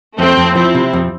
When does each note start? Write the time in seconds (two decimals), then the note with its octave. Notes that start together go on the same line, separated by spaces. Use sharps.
0.18 F2 A3 C4
0.37 F2
0.56 F3 C4 E4
0.75 C3
0.93 F2